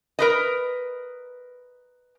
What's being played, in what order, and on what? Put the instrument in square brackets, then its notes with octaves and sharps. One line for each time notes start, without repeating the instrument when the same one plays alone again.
[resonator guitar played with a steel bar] A#4 B4 D#5